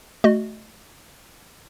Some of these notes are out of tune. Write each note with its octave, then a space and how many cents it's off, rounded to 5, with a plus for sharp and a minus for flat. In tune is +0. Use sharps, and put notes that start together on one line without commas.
A3 -10 F#4 +15 D#5 -25